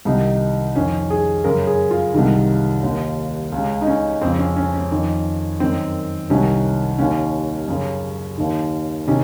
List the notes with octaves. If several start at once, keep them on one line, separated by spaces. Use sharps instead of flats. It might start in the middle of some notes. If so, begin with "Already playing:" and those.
C2 C3 D#3 D#4
F2 D#3 C#4
G#4
F#2 C#3 A#4
G#4
F4
C2 C3 D#3
D#2 D#3
C#2
C#3
D#4
C#4
F2 C#3 C4
C#4
C#4
C#4
F2 D#3
F#2 D#3 C4
C2 C3 D#3 C#4
D#2 D#3 C#4
F#2 C#3
D#2 D#3
C3 D#3 C#4